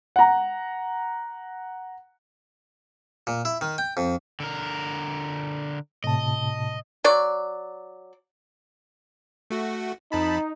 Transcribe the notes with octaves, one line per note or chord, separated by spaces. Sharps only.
F#5 A#5
A#2
E4
D#3
G5
F2
D3 A#4
A2 C3 D#5 A5
F#3 D5
A3 F#4
F2 D#4 A5 B5